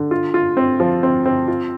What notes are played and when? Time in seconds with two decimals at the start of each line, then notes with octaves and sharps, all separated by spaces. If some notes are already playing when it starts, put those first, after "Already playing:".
Already playing: D3
0.11 F4
0.34 F4
0.57 C4
0.80 F3
1.03 C4
1.26 C4
1.48 F4